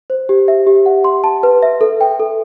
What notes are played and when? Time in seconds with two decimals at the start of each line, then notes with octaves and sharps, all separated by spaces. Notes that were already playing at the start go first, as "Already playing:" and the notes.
0.10 C5
0.29 G4
0.48 E5
0.67 G4
0.86 F#5
1.04 C6
1.24 A5
1.43 B4
1.63 E5
1.81 A4
2.01 G5
2.20 A4